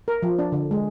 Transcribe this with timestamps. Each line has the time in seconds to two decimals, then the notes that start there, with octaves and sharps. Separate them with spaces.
0.08 A#4
0.23 F3
0.39 D4
0.52 D3
0.71 G#3